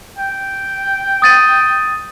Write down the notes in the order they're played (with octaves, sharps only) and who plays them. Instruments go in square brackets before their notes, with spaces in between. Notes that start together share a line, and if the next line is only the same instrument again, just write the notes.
[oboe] G5
[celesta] D#6 A6 D#7